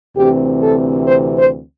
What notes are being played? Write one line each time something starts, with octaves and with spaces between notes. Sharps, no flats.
D2 C3 E3 C4 G4
A4
C5
C5